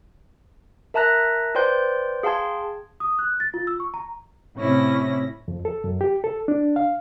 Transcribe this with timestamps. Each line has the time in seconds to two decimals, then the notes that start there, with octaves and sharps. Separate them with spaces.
0.94 A#4 E5 A5 A#5 F#6 A#6
1.55 B4 C5 D5 G5 C6 G6
2.23 G#4 F5 G5 A5 C6 G#6
3.00 D#6
3.19 F#6
3.40 A6
3.54 F4
3.67 E6
3.80 C#6
3.94 A#5
4.57 A2 C3 C#4 E4 A#6
5.48 F2
5.65 A4
5.84 F#2
6.01 G4
6.24 A4
6.48 D4
6.76 F5